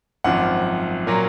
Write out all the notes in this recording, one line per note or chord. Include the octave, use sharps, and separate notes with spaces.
G#1 F#2 F3 F#5
A#2 F#3 A#3